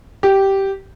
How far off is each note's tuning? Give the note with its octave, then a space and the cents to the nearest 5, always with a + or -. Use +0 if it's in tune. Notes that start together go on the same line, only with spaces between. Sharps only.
G4 -10